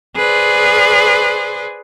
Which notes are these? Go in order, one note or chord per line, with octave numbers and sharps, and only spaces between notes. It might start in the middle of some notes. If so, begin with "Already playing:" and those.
G#4 B4 C5 D5